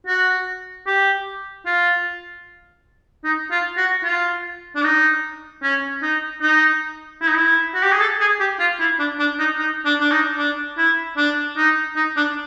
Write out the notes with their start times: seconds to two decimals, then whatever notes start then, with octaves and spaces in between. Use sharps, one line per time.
0.07 F#4
0.87 G4
1.66 F4
3.24 D#4
3.51 F4
3.77 F#4
4.04 F4
4.76 D4
4.83 D#4
5.63 C#4
6.02 D#4
6.42 D#4
7.21 E4
7.29 D#4
7.37 E4
7.75 F#4
7.83 G4
7.92 G#4
8.00 A4
8.20 G#4
8.40 G4
8.60 F4
8.80 E4
8.99 D4
9.19 D4
9.39 D#4
9.59 D#4
9.85 D4
10.00 D4
10.12 D#4
10.38 D4
10.78 E4
11.17 D4
11.57 D#4
11.96 D#4
12.17 D4